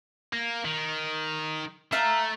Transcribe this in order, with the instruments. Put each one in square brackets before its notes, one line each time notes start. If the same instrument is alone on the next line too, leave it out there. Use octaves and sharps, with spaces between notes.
[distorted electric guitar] A#3
D#3
[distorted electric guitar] A3 [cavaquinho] E5 F5 A#5